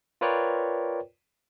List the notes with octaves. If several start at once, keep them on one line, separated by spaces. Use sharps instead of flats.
F4 A#4 B4 C#5 D5 G5